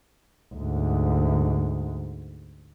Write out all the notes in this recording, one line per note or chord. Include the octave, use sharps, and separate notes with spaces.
D2 G#2